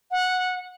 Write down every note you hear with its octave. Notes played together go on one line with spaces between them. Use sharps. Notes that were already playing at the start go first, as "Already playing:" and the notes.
F#5